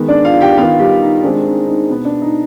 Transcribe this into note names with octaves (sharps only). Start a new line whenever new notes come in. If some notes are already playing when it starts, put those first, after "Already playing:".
Already playing: D#3 G#3 B3
D4 D5
F4 F5
G4 G5
D#3 B3 F4 F5
G3 G4
D#4
D#3 G#3 C4 D4
D#4
D#4
B2 B3
D4
D#4